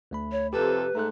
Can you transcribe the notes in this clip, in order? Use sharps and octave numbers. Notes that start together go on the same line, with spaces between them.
D2 A3 B5
C#5
F2 C3 G4 A4 B4
G#2 A3 A#5 F#6